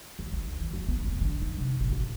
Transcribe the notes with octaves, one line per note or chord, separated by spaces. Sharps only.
D#2
D2
E3
E2
B3
F1
D3
D#4
C3
A1
A1